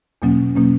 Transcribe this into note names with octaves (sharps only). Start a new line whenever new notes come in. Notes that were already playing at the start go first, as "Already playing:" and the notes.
E2 B2 F#3 A#3 C#4
B2 F#3 A#3 C#4